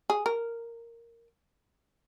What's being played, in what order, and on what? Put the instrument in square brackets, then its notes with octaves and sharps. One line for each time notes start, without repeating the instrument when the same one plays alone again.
[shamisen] G#4
A#4